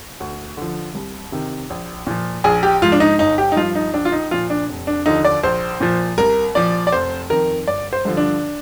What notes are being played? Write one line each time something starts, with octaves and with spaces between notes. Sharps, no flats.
D2
D3 F3
C2
C3 D#3
A#1
A#2 F3
A#1 G#4
G4
G#2 F3 F4
D4
D#4
G1 D#4
G4
D#4
G2 F3 F4
D#4
A#1 D4
F4
D#4
A#2 F3 F4
D4
F1
D4
D#2 D3 F3 D#4
D5
A#1 C5
A#2 F3
C2 A#4
A#2 F3 D5
D5
F1 C5
F2 D#3 A#4
G1 D5
C5
G2 D3 F3
D4